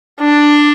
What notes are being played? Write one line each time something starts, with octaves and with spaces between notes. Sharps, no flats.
D4